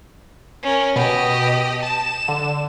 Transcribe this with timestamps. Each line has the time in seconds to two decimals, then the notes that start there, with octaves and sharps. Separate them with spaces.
0.63 C#4 A#4
0.96 B2 G4 D#5
1.83 A5 E7
2.28 D3